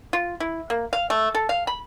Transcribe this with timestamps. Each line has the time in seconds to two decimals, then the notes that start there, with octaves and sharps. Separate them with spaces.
0.13 F4
0.40 E4
0.70 A#3
0.93 F5
1.10 A3
1.35 A4
1.49 F5
1.67 B5